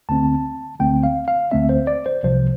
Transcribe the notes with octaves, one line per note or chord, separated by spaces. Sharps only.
D2 D3 A3 C4 A5
D2 D3 A3 C4 G5
F5
F5
D2 D3 A3 C4 E5
C5
D5
C5
C2 C3 F3 C5